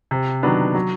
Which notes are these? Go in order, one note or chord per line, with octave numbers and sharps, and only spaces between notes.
C3
D#3 F#3 B3 D4
F#3